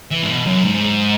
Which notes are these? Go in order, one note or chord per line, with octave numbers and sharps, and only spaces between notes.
E3
G#2
B2
F#2
G#2